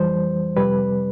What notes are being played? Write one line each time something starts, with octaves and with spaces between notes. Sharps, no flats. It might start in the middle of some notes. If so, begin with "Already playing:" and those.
Already playing: F2 E3 G3 C5
F2 C3 G3 B4